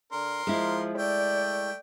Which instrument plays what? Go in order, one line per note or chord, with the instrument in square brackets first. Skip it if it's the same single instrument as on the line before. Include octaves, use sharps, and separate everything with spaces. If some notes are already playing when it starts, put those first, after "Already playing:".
[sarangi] D3 [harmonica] A#4 C6
[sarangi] F3 [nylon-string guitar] G#3 E4
[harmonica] A3 G5 [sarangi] D5